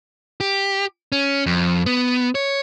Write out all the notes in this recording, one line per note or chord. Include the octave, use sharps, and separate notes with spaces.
G4
C#4
F2
B3
C#5